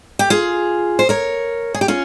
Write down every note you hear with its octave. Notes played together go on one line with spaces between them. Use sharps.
G4
F4 G#4
C5
A#4 C#5
G#4
G4
C#4 F4